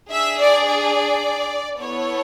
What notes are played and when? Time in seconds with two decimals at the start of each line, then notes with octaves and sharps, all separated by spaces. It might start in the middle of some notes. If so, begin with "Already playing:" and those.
0.10 D4 G#4 E5
0.39 D5
0.66 D5
1.79 B3 E4 A4 C#5